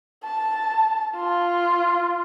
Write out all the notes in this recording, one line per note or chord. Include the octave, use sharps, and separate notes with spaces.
A5
F4